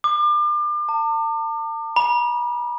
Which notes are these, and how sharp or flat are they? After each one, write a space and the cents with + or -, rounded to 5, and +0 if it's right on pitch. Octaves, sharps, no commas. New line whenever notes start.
D6 +35
A5 +45
B5 -40